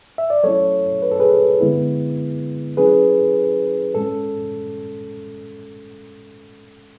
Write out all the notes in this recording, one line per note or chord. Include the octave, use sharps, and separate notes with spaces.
E5
D5
F#3 A3 C#4 E4 A4 C#5
B4
A4
G#4 B4
D3 G#3 B3 E4
F#3 C#4 E4 G#4 B4
A2 G#3 C#4 A4